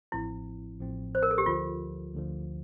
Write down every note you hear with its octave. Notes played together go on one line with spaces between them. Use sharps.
A1 A2 F3 C4 E4
A1 A2 F3 C4
C5
A#4
A4
G4
D2 D3 F3 F4
D2 D3 F3